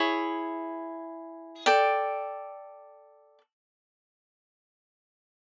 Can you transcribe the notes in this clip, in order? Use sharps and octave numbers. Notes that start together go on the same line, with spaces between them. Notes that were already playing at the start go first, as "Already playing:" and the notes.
Already playing: E4 G#4 C#5
A4 D5 G5